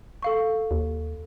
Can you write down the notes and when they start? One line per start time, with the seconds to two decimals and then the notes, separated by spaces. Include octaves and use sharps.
0.22 A4 F5 C#6
0.71 D#2